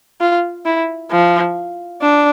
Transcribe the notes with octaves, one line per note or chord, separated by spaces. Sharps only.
F4
E4
F3
D4